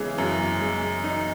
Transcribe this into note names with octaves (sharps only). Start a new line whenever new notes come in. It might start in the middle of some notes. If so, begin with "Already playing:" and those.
Already playing: C#3 E3 G#3
F#2
G#3
D#4